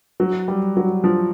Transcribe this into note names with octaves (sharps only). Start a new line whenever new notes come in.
F#3
G3
F#3
F3